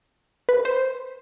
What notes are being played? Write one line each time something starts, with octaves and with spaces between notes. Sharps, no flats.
B4
C5